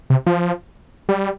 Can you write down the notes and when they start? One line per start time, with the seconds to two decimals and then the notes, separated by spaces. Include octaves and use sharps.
0.10 C3
0.26 F3
1.09 G3